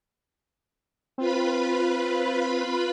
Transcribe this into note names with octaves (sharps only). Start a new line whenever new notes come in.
C4 F4 B4 B5